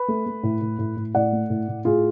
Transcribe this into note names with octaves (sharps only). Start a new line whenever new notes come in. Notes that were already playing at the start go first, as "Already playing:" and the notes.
Already playing: B4
A3
A3
A2
A2
A2
A2
A2 D5 F#5
A3
A2
A2
A2 F4 G#4